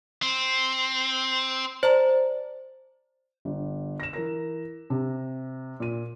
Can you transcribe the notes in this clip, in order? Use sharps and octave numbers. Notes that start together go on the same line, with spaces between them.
C4
C5 D5 A5 A#5
G1
A#6 E7
E3 A#4 A#6
C3
A#2 D#7